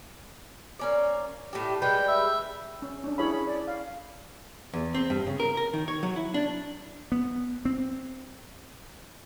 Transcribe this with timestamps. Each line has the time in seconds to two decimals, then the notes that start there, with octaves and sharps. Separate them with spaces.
0.79 A#3 C#4 D5
1.53 A2 G3 G4
1.82 G3 G#3 B4 G5
2.08 E5
2.82 C#4
3.04 C#4 D4
3.18 C#4 E4 G#4 C#5 E5 B5
3.47 D5
3.67 F5
4.74 E2
4.95 C4
5.10 G2
5.27 C#3
5.40 A#4
5.57 A#4
5.73 D#3
5.88 C#5
6.03 F#3
6.16 E4
6.34 D4
7.12 B3
7.65 C4